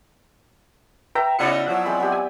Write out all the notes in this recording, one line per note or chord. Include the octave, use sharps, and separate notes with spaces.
B4 E5 G5 A#5
C#3 B3 D#4 E4 F#4 D5 C#7
F3 F#3 F#5
G#3 C4 B5
B3 G4
G#5